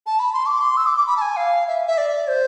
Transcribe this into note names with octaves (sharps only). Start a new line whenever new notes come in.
A5
B5
C6
D6
C6
E6
D6
D6
B5
A5
G#5
F5
E5
E5
D5
C5